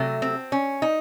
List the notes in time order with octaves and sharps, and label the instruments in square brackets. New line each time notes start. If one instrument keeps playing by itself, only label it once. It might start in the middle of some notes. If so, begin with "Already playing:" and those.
Already playing: [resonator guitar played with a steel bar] C3 F#3 A3
C4
C#4
D#4